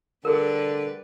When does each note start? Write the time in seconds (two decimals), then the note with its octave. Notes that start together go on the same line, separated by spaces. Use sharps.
0.25 D3 G3 G#4 A#4 B4 D5